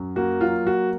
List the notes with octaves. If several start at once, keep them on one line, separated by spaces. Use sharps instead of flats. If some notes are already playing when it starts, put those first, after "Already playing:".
Already playing: F#2 F#3
A#3 F#4
F#3 F4
A#3 F#4